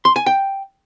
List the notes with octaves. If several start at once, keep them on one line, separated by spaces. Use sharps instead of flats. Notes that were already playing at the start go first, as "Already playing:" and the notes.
C6
G#5
G5